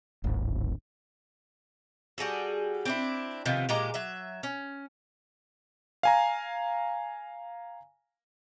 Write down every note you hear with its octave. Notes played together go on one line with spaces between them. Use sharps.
D1 G#1
G3 F#4 G#4 A4
C4 D4 E4
C3 D#3 F3 B3
A#2 G#3 G4 A#5
F#3 E5
C#4
F5 G#5 A#5